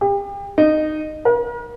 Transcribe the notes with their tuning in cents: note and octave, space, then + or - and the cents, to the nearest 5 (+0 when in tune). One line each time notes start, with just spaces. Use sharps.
G4 +35
D#4 -15
A#4 +45